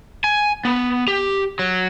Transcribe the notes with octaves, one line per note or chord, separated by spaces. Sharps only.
G#5
B3
G4
F#3